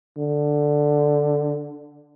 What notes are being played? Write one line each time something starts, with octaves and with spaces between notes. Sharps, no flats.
D3